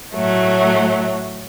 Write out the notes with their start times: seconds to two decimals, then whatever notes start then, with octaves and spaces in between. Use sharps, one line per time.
0.14 A2 F#3 A3